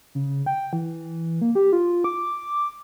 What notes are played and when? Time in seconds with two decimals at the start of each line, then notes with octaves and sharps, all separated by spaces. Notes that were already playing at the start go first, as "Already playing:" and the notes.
0.15 C#3
0.46 G5
0.73 E3
1.41 A#3
1.55 G4
1.73 F4
2.04 D6